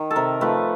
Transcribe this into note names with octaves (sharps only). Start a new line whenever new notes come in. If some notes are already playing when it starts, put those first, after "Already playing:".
Already playing: D#3
A4
C3 A#4
F3 A3 B4